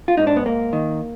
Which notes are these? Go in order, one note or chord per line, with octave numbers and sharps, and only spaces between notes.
F4
G#2 D#4
D4
B3
G#2 A#3
D#3